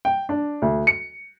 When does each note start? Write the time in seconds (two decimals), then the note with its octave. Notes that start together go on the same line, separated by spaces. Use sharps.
0.05 G5
0.29 D4
0.62 D2
0.87 C#7